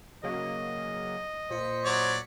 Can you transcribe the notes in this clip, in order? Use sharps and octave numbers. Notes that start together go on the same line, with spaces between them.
C#3 F#3 A#3 D#5
A#2 C5 B6 C#7
F#3 C#5 D5